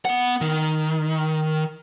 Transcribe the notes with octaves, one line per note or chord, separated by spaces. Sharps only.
B3 F#5
D#3